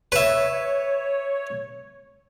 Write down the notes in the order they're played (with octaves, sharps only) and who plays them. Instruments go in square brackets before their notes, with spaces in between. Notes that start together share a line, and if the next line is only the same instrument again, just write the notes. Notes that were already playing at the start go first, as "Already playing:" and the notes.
[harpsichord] B4 E5 [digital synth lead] C#5